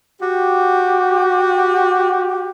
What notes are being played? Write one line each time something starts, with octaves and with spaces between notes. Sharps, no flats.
F#4 G4